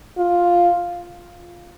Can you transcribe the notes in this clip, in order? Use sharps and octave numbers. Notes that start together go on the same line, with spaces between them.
F4